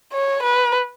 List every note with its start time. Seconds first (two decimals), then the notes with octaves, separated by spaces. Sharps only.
0.13 C#5
0.43 B4